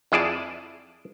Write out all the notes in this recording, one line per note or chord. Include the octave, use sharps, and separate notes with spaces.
F2 E4 G#4 D5 A5